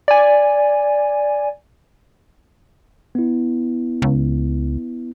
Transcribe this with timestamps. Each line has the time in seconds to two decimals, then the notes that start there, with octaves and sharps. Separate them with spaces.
0.08 D5 G#5
3.15 B3 E4
4.02 C#2